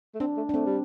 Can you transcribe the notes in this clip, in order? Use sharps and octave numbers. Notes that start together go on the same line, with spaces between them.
A3
C4 D4
A3
D4
A3 C4
G3